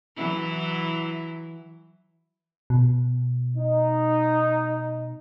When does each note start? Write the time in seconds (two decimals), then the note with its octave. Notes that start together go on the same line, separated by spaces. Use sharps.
0.16 E3 F#3 E4
2.70 B2
3.57 D#4